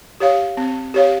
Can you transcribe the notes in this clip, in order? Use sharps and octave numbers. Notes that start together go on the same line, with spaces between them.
G4 C#5 F5
C4
G4 C#5 F5